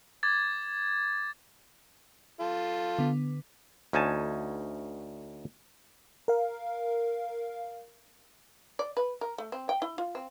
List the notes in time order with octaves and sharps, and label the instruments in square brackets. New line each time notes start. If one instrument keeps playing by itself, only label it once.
[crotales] D6 G#6 A6
[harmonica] F4 A4
[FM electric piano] D3 B3
[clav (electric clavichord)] D2 C#4 D#4 G#5 A5
[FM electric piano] A#4 F5
[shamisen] D5
B4
A#4
A3
C4
G5
E4
F4
C4